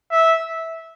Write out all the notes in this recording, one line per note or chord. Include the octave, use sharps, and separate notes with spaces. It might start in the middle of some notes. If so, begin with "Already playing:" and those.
E5